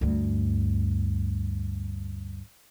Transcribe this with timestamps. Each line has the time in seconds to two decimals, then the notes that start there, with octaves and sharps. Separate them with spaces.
0.01 D2 G2